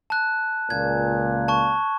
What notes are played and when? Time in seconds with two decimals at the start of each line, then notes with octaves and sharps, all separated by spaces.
0.10 A5 F#6
0.70 C#2 A#2 G#6
1.48 A5 C#6